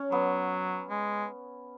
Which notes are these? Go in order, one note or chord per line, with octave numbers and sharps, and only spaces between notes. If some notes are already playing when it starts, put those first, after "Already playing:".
Already playing: C#4
F#3 B3
G#3